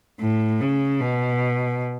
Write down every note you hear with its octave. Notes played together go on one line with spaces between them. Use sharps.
A2
C#3
B2